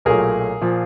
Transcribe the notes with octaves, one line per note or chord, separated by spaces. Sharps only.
B1 A#2 F#3 A3 G#4 A#4
A#2 F3